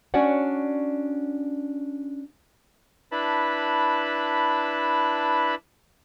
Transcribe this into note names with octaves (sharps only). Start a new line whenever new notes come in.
C#4 D4 F#4 C#5 D5 F#5
D4 E4 B4 A5 B5